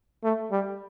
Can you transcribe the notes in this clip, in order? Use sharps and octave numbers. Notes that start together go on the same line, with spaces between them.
A3
G3